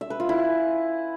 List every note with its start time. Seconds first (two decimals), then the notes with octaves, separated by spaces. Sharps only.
0.01 E5
0.10 B4
0.20 F4
0.29 E4
0.38 G#5